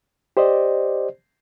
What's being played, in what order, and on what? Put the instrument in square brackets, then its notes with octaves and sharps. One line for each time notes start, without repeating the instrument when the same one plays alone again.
[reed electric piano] G4 C5 D5 D#5